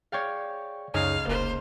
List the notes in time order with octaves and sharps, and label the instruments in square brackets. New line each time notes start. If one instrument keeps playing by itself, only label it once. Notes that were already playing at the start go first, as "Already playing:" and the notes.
[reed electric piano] G#4 G5 C#6 [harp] C#5 D5 F5
[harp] C#2 D#5 [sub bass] F#2 [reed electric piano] D#4 G#4 C#5 [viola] F5
[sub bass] F1 [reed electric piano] A#3 [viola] C5